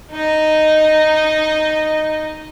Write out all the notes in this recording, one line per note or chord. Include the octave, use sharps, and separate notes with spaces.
D#4 D#5